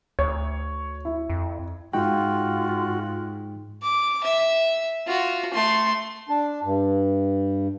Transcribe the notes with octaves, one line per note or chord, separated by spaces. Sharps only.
D2 C#5
E4
F2
G#2 G#3 D#4 F4 F#4 G5
D6
E5
F4 F#4
A3 C6
D4
G2